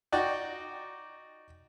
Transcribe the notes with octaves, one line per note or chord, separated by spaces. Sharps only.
D#4 F#4 D5 G5